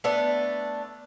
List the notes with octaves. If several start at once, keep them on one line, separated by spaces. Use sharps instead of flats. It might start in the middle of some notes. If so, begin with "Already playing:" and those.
A3 B3 D4